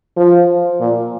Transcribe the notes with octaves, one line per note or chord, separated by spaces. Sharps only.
F3
A#2